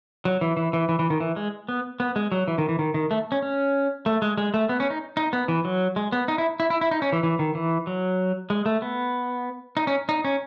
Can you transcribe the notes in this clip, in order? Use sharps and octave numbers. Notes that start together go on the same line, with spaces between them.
F#3
E3
E3
E3
E3
E3
D#3
E3
G#3
B3
B3
G#3
F#3
E3
D#3
E3
D#3
D#3
A3
C#4
C#4
A3
G#3
G#3
A3
B3
C#4
D#4
D#4
B3
E3
F#3
G#3
B3
D#4
E4
E4
E4
E4
D#4
C#4
E3
E3
D#3
E3
F#3
G#3
A3
B3
D#4
C#4
D#4
C#4